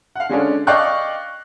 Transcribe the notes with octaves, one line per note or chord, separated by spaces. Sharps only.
F5 F#5
D3 G#3 C#4 D4
D5 D#5 F5 G5 C#6 F#6